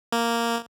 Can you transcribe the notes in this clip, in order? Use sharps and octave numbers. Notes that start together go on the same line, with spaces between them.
A#3